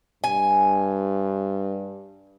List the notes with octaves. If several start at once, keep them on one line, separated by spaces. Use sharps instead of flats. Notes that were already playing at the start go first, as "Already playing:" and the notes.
G2 G#5